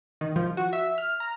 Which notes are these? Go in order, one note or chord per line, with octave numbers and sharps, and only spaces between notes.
D#3
F3
F#4
E5
F6
A#5